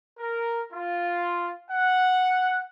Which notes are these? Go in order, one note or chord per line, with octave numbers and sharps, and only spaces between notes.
A#4
F4
F#5